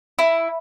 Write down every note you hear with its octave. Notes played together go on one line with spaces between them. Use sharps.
E4